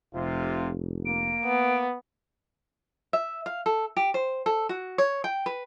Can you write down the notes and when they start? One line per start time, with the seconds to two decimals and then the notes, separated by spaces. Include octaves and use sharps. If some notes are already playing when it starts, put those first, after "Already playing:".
0.15 F1 C3 F4
1.06 A#3 D7
1.44 B3
3.13 E5
3.46 F5
3.66 A4
3.97 G4
4.14 C5
4.46 A4
4.69 F#4
4.98 C#5
5.24 G5
5.46 B4